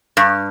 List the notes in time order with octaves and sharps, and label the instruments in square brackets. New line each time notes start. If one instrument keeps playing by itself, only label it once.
[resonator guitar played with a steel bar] G2